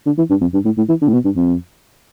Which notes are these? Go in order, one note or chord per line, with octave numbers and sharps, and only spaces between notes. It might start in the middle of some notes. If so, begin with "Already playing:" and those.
D3
E3
G2
F2
G2
A2
A2
E3
D3
A2
B2
G2
F2